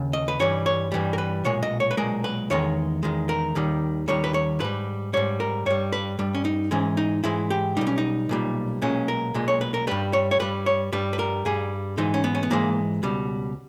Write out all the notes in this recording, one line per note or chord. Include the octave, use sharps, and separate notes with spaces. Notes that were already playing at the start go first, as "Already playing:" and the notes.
Already playing: D#2 C#3
D#5
B4
G2 E3 G3 C#5
C#5
G2 E3 G3
A#4
B4
B1 A#2 G#3 C#5
D#5
C#5
B4
B1 A#2 G#3 A#4
B4
E2 D#3 G#3 C#5
E2 D#3 G#3
A#4
D#2 D#3 G3
D#2 D#3 G3 C#5
B4
C#5
G#2 G3 B4
G#2 G3 C#5
A#4
G2 G3 C#5
B4
G2 G3
C#4
D#4
G#2 E3 G#3 C#4
D#4
G#2 E3 G#3 E4
G4
B1 A#2 G3 D#4
C#4
D#4
B1 A#2 G3
B1 A#2 G#3 C#4
A#4
B1 A#2 G#3
C#5
B4
A#4
G2 G3 B4
C#5
C#5
G2 G3 B4
C#5
G2 G3 B4
B4
A#4
G2 G3 G#4
G#2 E3 G#3 D#4
C#4
B3
C#4
B3
G#2 E3 G#3 A#3
C#2 B2 G3